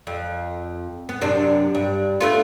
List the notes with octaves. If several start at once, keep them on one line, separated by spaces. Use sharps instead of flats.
F2
B3
F#2 C3 D4
G2
A3 B3 F4